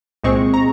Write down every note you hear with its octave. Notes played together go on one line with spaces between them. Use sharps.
C2 A#2 G#3 C4 C#6
A#5